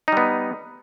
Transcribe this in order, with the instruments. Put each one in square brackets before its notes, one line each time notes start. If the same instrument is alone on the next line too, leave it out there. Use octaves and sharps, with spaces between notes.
[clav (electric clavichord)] D#4
G3
B3